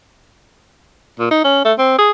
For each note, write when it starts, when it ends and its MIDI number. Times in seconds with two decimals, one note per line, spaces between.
1.19 1.30 46
1.31 1.41 63
1.44 1.64 61
1.65 1.73 57
1.78 1.97 60
1.98 2.11 68